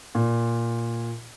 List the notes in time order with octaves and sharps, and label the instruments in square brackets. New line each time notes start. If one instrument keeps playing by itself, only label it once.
[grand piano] A#2